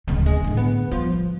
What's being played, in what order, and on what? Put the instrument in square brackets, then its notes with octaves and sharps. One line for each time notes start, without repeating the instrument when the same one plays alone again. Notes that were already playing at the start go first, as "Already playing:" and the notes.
[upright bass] D1 A3 [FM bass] C#2
[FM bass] G#3
[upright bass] A2 D3
[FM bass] B3
[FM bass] F3 [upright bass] G3